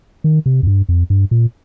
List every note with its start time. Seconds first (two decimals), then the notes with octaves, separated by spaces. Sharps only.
0.24 D#3
0.46 C3
0.63 F2
0.67 G2
0.89 F2
1.10 G2
1.31 A#2